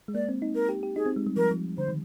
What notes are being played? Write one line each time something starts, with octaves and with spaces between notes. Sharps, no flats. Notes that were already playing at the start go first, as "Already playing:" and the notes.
G#3
A#3 D5
C4
D#4
A#4
G4
G4
D#4 G#4
C4
G#3
G3
F3 A#4
F3
D3 C5
D#3